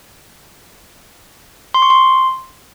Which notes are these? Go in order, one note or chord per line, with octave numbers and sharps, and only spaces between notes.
C6
C#6
C6